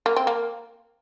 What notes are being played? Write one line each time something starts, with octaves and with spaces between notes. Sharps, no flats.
A#3
C4
A#3